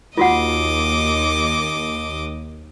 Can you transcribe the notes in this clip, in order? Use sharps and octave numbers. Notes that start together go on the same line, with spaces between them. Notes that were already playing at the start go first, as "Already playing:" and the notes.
D#2 F4 F#4 D#5 F#5 D6